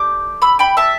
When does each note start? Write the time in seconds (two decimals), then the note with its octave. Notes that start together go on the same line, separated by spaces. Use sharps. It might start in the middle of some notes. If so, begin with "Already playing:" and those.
Already playing: A3 D4 G4 D6 G6
0.42 B5 E6
0.59 G5 B5
0.77 E5 A5